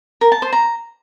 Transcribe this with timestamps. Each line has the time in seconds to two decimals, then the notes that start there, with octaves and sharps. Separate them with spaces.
0.21 A#4
0.32 A5
0.42 C5
0.53 A#5